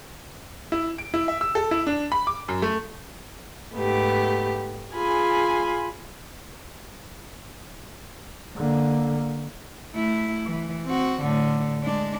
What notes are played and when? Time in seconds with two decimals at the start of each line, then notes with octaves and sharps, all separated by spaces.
0.72 E4
0.98 D7
1.14 E4
1.28 E5
1.41 E6
1.55 A4
1.71 E4
1.87 D4
2.12 B5
2.27 D6
2.48 F#2
2.62 A3
3.74 G#2 A3 B3 G4
4.95 F4 G#4 G#5 B5
8.57 D3 A#3
9.92 A3 E4
10.46 E3
10.87 C4 F#4
11.21 A2 D3
11.84 G#3 D4